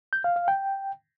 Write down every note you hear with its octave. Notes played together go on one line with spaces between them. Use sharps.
G6
F5
F5
G5